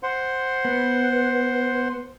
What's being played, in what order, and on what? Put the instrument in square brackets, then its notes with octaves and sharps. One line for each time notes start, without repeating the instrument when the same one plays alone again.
[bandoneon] C5 F#5 C6
[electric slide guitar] B3